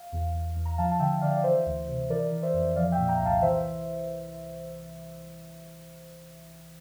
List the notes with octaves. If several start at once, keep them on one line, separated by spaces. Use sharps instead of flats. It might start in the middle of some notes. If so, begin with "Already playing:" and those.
Already playing: F5
E2
E2
E2
A#5
F3 F5 A5
A5
D3 E5 G5
D3 D5 F5
D5
E3 C5 E5
D2
C3
E3 A#4 D5
E3
C5 E5
F2
F3 D5 F5
E5 G5
A#2
G5 A#5
C2
F5 A5
E3 C5 E5